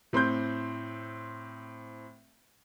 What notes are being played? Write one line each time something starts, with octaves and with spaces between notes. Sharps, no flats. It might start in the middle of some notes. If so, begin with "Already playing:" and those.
A2 C4 C6 G6